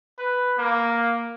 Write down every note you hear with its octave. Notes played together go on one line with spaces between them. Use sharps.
B4
A#3